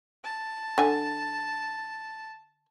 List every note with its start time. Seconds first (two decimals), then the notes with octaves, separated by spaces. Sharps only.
0.24 A5
0.78 D3 G#5